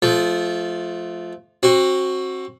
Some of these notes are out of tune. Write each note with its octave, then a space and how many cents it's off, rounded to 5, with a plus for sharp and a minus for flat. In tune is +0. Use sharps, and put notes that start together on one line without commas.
F3 +0 A3 -25
C4 +25 F#4 +0